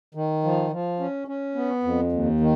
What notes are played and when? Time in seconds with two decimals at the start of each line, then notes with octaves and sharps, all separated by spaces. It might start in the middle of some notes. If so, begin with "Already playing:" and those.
0.15 D#3
0.44 F3
0.71 F3
1.00 C#4
1.28 C#4
1.55 B3
1.83 F2
2.12 D#2
2.40 D#3